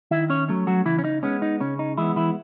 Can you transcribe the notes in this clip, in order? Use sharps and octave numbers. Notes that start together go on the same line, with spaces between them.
D#3 E4 E5
C#4 C#5
F#3 A3 C#4
F#3 F#4
C#3 E3 E4
C#4
D#4
G#3 B3 C#4
D#4
C#3 C#4
D#4
E3 G#3 B3 E4
E3 E4